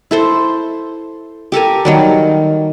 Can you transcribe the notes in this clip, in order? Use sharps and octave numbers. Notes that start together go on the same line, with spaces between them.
E4 A4 C5
G4 A4 A#4 G#5
D#3 F#3 G3